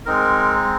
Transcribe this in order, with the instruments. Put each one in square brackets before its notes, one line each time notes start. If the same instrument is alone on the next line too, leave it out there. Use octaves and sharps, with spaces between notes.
[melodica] G#3 C4 D#4 A#4